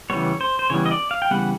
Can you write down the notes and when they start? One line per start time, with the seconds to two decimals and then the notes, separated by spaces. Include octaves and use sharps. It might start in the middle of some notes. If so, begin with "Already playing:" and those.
0.10 C#3 E3 G3 B3 C#5
0.41 C5
0.59 C5
0.70 C#3 E3 G3 B3 C#5
0.86 D#5
0.91 D5
1.11 F5
1.22 G5
1.31 C#3 E3 G3 B3 F#5